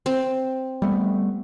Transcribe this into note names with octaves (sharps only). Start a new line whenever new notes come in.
C4
G3 A3 B3